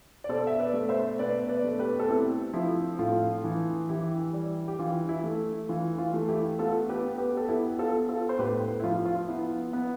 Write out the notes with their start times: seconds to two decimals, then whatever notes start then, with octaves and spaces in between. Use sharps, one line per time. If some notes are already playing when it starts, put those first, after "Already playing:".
0.24 D5
0.29 B2 A4 C5
0.47 E5
0.59 B4 D5
0.74 A3
0.89 C5 E5
1.19 B2 B4 D5
1.49 B4 D5
1.64 A3
1.79 G4 B4
2.00 A4
2.09 C4 E4 G4
2.53 F3 E4
2.99 A2 F4
3.44 E3
3.89 E3 E4 G4
4.33 G3
4.68 G4
4.79 E3 F4
5.09 E4
5.23 A3
5.69 E3 F4
5.98 F4
6.14 A3
6.28 E4 G4
6.59 B3 F4 A4
6.89 G4 B4
7.04 B3
7.18 G4 B4
7.37 A4
7.49 B3 E4 G4
7.79 F4 A4
7.94 B3
8.09 F4 A4
8.29 C5
8.39 A2 G4 B4
8.80 E4
8.83 F3 F4
9.05 F4
9.28 B3 E4
9.73 B3